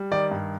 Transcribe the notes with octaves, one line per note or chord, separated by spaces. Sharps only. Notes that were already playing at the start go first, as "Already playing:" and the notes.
Already playing: G3
D#3 D5
G2